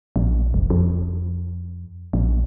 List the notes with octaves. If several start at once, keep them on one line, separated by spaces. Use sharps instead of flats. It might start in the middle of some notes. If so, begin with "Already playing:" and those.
A#1
F1
F2
A#1